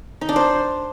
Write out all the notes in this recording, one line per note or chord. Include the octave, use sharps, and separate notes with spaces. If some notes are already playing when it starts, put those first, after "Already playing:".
D#4
D4
C5